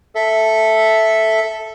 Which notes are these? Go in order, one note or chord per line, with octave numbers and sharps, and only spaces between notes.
A4 E5